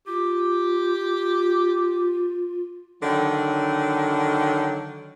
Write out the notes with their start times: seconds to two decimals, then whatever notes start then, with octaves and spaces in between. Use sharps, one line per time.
0.07 F4 G4
3.02 D3 D#3 F#3